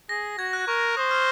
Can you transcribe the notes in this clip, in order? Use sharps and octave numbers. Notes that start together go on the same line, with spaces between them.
G#4 A#6
F#4 G#6
F#6
A#4 C#6
C5 D#6
F6